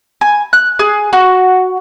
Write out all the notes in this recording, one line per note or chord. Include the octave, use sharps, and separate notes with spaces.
G#5
F#6
G#4
F#4